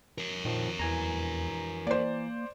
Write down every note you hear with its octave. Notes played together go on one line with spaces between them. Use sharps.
A#4 C#5
A#2 D#3 F3
E2 E3 G#5 A#5
A#3 C5 D5